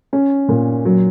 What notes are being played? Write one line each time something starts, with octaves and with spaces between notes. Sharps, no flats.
C#4
A#2
F#3